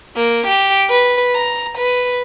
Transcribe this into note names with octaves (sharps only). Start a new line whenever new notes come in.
A#3
G4
B4
A#5
B4